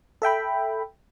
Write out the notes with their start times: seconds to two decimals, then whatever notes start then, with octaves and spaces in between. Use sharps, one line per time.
0.22 A4 E5 G5 B5